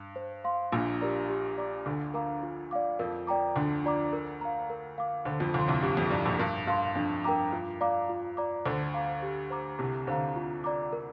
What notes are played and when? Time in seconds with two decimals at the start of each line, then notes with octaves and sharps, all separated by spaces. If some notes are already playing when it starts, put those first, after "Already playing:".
Already playing: G2
0.16 C5
0.44 F5 C6
0.72 A#1 A#2 D4
1.01 G4 A#4 D5 A#5
1.29 G4
1.58 D5 A#5 D6
1.86 D2 D3 D4
2.14 A#4 F5 A#5 D6
2.43 F4
2.71 D5 F5 D6
2.99 F2 F3 A#4
3.27 D5 G5 A#5 D6
3.56 D2 D3 D4
3.84 F4 D5 A#5 D6
4.13 A#4
4.41 F5 A#5
4.70 A#4
4.98 F5 D6
5.25 D2 D3 C5
5.40 F2 F3
5.54 D2 D3 F5 C6
5.68 C2 C3
5.83 G2 G4
5.97 F2
6.10 G2 D5 A#5 D6
6.25 A#1 A#2
6.39 G2 A#4
6.67 G2 F5 C6
6.95 F2 D4
7.24 G2 A#4 G5 A#5 D6
7.52 G2 F4
7.81 D5 F5 A#5 D6
8.09 F4
8.37 D5 A#5 D6
8.66 D2 D3 C5
8.94 F5 A#5 D6
9.22 G4
9.50 C5 A#5 D6
9.79 C2 C3 G4
10.07 D2 D3 C5 F5 A#5
10.36 F4
10.64 D5 A#5 D6
10.93 A#4